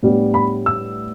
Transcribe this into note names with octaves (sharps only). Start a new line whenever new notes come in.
A2 G3 B3 D4
B5
E6